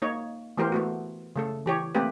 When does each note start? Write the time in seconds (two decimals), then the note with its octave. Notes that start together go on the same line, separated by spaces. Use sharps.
0.02 A#3 D#4 C#5
0.57 E3 A3 B3 G4 A#4 C5
0.72 A3 B3 F#4
1.36 C#3 A3 A4
1.66 E3 G4 C#5
1.95 A3 A#3 C4 G4 B4